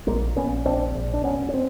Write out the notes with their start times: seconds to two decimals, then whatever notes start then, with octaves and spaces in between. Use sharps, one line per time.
0.07 A#1 G#3 A#3
0.36 A#1 B3 C#4
0.65 A#1 C4 D4
0.95 A#1
1.13 D4
1.24 E1 B3 C#4
1.49 C#4
1.54 C4